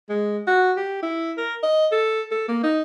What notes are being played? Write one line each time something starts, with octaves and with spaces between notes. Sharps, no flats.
G#3
F#4
G4
E4
A#4
D#5
A4
A4
A#3
D#4